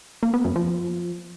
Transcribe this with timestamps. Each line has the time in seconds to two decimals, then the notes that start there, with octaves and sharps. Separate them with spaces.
0.23 A#3
0.34 B3
0.45 F#2
0.56 F3